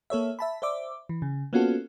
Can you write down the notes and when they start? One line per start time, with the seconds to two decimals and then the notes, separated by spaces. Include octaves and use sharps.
0.10 A#3 A4 C#5 E5
0.39 E5 A5 B5
0.62 C5 D5 E5 D6
1.09 E3
1.22 C#3
1.53 A#3 B3 C#4 F4 F#4 A4